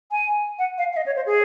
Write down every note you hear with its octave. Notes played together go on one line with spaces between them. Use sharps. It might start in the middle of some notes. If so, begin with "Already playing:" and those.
G#5
F#5
F5
F5
D#5
C#5
C5
G#4